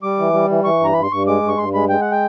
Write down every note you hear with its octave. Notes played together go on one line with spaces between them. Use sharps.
G3 D6
E3
G3
E3
E3 C#6
G2 A#5
G2 B5
C6
G2 C#6
G#3 D6
G2
C#6
G2 C6
G#3 B5
G#3 G5
F#5
G5